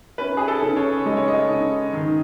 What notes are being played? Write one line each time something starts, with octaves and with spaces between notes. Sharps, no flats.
C#4 B4
G#4
A4
C#3
C#5
G#3 D#5
C#5
D#5
C#3
D#3